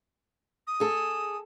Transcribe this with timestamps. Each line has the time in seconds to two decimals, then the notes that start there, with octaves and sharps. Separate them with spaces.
0.67 D#6
0.80 G#4 A4